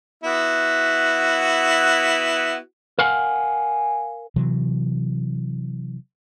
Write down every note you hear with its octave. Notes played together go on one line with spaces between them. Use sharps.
B3 E4 F#4
A#4 F5 F#5 G#5
C3 E3 F#3